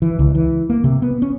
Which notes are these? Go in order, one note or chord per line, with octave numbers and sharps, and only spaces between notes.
E3
C#2
E3
A#3
C3
B3
C#4